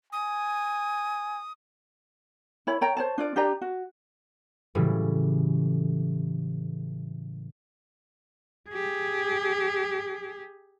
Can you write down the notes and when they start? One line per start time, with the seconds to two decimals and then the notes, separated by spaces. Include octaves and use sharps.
0.13 G#5 D#6
2.67 E4 C#5 B5
2.81 C#5 G5 A#5
2.97 C5 C#5 A5
3.18 D4 F4 D5
3.36 D4 G4 D5 A#5
3.61 F#4
4.75 A2 C#3 E3 F#3 G3
8.69 G4 G#4